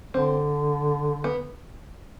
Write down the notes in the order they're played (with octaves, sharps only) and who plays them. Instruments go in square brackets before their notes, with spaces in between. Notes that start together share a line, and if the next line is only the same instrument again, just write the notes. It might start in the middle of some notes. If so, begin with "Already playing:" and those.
[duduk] D3 [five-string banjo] C4
[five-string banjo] B3